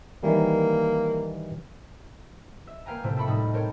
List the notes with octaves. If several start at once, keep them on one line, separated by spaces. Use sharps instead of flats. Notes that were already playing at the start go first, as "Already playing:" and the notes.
D#3 E3 G3 A#3
E5
A#3 B4 F5 G5 G#5 A#5
A2 C3 A3 C4 E4
F4 A4 E5 G5 B5 C#6
A2 G3 D#4
C4 A4 A#4 C#5 G5